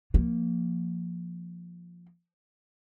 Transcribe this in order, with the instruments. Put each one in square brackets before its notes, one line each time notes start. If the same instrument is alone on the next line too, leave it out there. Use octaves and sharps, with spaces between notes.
[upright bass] F3 A#3